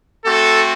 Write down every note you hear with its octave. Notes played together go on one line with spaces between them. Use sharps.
A3 C4 F#4 A4